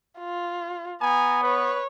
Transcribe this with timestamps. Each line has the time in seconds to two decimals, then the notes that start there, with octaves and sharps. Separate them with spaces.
0.20 F4
1.02 B3 G#5 A#5
1.44 B4 C#5